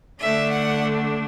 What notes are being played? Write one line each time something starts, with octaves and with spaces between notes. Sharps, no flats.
D3 A3 D4 E5
F#5